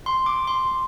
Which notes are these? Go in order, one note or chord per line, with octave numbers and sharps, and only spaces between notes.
C6
D6
C6